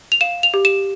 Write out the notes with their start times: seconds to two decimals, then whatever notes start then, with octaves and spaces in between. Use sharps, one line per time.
0.12 F7
0.21 F5 E7
0.43 F7
0.54 G4
0.65 E7